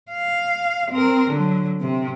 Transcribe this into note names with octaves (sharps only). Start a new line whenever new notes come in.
F5
C4 A#4
D3 F#3
C3